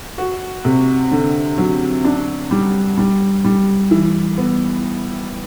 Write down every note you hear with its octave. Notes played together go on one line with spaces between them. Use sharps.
F#4
C3
D3
F#3
D4
G3
G3
G3
E3
B3